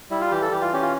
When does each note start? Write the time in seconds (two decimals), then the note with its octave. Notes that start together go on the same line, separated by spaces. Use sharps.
0.10 G3 E4
0.21 F4
0.31 E3 G4
0.42 A4
0.51 E3 G4
0.62 F4
0.73 C#4 G4
0.82 F4